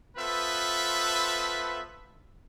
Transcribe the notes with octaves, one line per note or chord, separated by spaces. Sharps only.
B3 F4 A4 B4 C5 E5